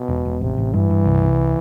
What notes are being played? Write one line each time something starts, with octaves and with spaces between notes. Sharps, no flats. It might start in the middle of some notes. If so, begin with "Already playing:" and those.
Already playing: B2
E1
E1
A1 C3
A1
G2 E3
G2
C2
C2